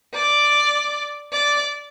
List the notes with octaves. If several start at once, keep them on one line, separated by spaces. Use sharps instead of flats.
D5
D5